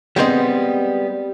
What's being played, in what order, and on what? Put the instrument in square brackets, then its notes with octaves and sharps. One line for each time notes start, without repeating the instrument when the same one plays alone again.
[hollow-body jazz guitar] G3 G#3 B3 C4 C5 D#5